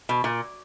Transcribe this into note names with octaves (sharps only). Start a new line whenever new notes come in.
B2
A#2